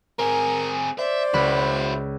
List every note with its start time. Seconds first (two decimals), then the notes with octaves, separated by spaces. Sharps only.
0.19 C4 G#4 A#4
0.99 C5 D5 E5
1.34 C#2 E4 F#4 B5